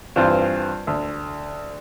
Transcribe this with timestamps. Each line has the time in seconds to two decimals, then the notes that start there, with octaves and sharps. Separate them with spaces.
0.16 G2 E3 C4 F4
0.87 D2